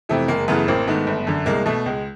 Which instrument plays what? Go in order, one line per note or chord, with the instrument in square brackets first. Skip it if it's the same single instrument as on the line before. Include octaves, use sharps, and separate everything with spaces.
[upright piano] F2 C3 E3 A3
F#1 G#3 A#3
F#2 C#3 E3 A3 B3
A1 A#3 C4
G#2 D#3 A3 B3
G1
F#2 D3
C2 G#3 A#3
B2 A3
C#2 G#3